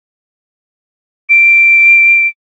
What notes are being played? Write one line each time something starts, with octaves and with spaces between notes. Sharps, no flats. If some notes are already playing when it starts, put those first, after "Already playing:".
D7